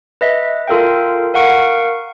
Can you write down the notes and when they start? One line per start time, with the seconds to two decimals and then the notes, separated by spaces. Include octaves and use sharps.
0.21 B4 D#5 E5
0.68 F4 A4 A#4 F5 G5
1.34 A#4 F5 F#5 C#6 D7